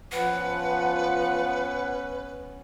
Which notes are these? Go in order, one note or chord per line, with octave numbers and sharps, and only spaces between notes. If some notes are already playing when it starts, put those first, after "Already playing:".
F3 B3 C#4 B4 F#5